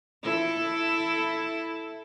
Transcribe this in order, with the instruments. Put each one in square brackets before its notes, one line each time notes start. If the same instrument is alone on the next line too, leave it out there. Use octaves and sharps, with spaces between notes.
[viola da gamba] E4 A4